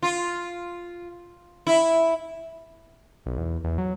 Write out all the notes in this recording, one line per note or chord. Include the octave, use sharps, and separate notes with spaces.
F4
E4
B1
E2
E2
F#3